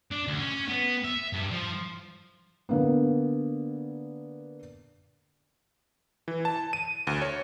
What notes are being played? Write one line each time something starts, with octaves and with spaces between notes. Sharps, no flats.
D4
D2
C#4
B3
E5
G2
F3
D3 A#3 B3
E3
A5
D#7
D2
C#5